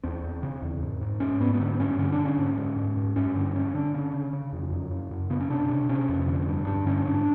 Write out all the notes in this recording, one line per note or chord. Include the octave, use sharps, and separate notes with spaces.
E2 C4
E2
C#3
E2
G#2
G#2
G#2 C#4
G#2 B3
B3
D3 C4
G2 C#4
D3 C#4
D4
D3
C#4
G#2
G#2
G#2
G#2
G2 C#4
D3
D3 C#4
D3 D4
C#3 C#4
C#3
C#3
F2
F#2
C#3
F#2
C#3 B3
C#4
C3 D4
C3
C3 C#4
F2
D3
G2
G2 D4
D3 C#4
G#2 D4